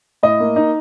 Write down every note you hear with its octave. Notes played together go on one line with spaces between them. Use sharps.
A2 D#5
A#3
D#4